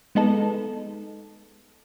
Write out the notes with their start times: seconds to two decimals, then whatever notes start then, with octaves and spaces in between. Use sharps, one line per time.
0.15 G#3 B3 D#4 A4